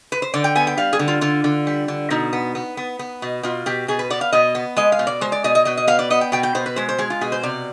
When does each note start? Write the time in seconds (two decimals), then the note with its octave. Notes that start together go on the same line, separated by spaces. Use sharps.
0.12 B4
0.22 C5
0.34 D3 D5
0.44 G5
0.55 B3 G#5
0.67 G5
0.77 G3 F5
0.93 G#4
0.99 D3
1.08 F4
1.21 D3 F4
1.44 D3
1.67 G3
1.88 D3
2.10 B2 D#4
2.33 B3
2.55 B3
2.77 B3
2.99 B3
3.22 B2
3.43 B2 F4
3.66 B2 G4
3.88 B2 G#4
3.99 B4
4.10 B3 D5
4.21 F5
4.32 B2 D#5
4.55 B3
4.76 G#3 D#5
4.92 F5
4.99 B2
5.07 D5
5.21 G#3 C5
5.32 D5
5.44 B2 D#5
5.55 D#5
5.65 B2 D#5
5.77 D#5
5.87 B3 F5
5.99 D5
6.10 B3 D#5
6.21 G5
6.32 B2 G5
6.43 G5
6.55 B2 C5
6.66 B4
6.76 G#3 C5
6.89 C5
6.98 G#3 G#4
7.10 F4
7.21 B2 G#4
7.32 C5
7.43 C3 D5